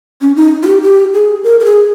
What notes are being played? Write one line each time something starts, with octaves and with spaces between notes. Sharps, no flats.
C#4
D#4
F4
G4
G4
G#4
A#4
A#4
G#4